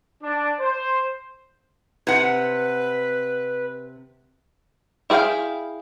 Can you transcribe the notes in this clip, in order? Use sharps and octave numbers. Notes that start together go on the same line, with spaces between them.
D4
C5
C3 B4 F#5
E4 G#4 B4 F5 G5